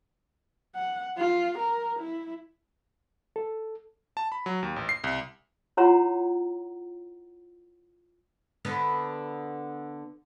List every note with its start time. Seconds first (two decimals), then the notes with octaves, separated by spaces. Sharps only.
0.76 F#5
1.18 F4
1.58 A#4
1.99 E4
3.36 A4
4.17 A5
4.32 B5
4.46 F#3
4.63 D#2
4.76 A1
4.89 C7
5.04 C2
5.77 E4 F4 C#5 F#5 A#5 C6
8.65 D3 B3 B4